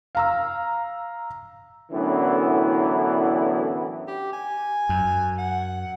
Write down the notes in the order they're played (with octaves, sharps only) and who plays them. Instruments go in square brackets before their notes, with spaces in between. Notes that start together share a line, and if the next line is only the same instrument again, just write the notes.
[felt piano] F5 A#5 E6
[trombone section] F#2 A2 D3 E3 B3 D4
[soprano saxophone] G4
G#5
[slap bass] F#2
[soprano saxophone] F#5